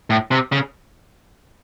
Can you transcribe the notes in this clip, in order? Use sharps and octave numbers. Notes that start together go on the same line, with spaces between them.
A2
C3
C#3